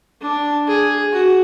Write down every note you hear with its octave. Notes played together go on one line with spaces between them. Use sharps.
D4
G#4
F#4